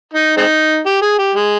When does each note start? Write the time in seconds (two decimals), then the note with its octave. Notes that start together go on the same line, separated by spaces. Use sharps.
0.13 D#4
0.37 G#3 C4 D#4
0.86 G4
1.02 G#4
1.19 G4
1.35 G#3